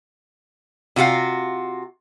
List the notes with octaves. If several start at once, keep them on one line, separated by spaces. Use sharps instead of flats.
C3 F4 F#4 F5